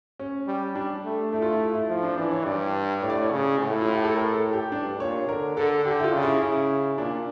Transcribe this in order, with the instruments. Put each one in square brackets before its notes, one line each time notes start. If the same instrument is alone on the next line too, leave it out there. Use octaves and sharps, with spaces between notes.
[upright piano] C#4
[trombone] G3
[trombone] G3 [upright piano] D4
[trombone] A3
[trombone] A3 [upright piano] E4
[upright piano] F4
E4
F4
E4
[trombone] F3 [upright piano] E4
[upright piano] D4
[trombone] E3 [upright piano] D4
[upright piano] C#5
[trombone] G2 [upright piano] D5
[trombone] A2 [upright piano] C#5
[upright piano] D5
C#5
[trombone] C#3
A2
[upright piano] F4
G4
A4
A#4
A4
G4
[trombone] G2 [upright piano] D4
[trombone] A#2 [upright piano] C#5
[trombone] D3 [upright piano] A#4
[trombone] D3 [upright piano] A4
[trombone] D3 [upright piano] G4
[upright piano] E4
F4
[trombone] C#3
[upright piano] E4
[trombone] C#3 [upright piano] E4
[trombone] A#2 [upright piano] D4